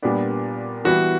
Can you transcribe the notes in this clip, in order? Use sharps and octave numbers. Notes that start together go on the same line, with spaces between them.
A#2 G3 B3 D4
E3 G3 B3 E4 F#4